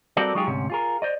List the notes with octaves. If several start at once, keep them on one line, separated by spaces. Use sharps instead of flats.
G3 C4 F#4 A4 A#4 D5
F#3 G#3 D#4 F4 G4 G#4
D2 G#2 C3 C#4
F4 G#4 A#4
C5 D5 D#5